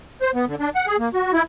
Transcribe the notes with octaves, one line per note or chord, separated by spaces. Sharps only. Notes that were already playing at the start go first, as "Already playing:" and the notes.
C5
B3
D3
D4
F#5
G#4
A#3
F#4
E4